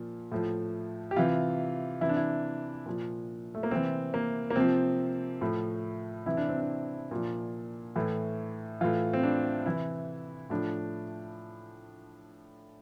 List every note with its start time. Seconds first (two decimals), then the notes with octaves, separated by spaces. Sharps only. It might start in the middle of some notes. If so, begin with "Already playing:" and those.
Already playing: A#2 F3
0.32 A2 F3
1.11 G4
1.16 C3 E3 F4
2.01 C3 E3 E4
2.09 D4
2.16 E4
2.86 A#2 F3
3.55 A3
3.63 A#3
3.71 C3 E3 C4
4.14 A#3
4.50 A#3
4.56 C3 F3 C4
5.41 A2 F3
6.26 C3 E3 E4
6.37 D4
6.49 C4
6.60 D4
7.11 A#2 F3
7.96 A2 E3
8.81 A2 E3 F4
9.13 C4
9.23 D4
9.66 C3 E3 E4
10.50 A2 F3 D4